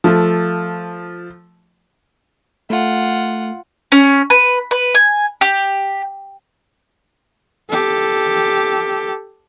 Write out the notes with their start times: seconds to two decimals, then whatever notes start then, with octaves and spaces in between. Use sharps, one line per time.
0.04 F3 A3
2.70 A3 F4 F#5
3.92 C#4
4.30 B4
4.71 B4
4.95 G#5
5.41 G4
7.70 G4 A4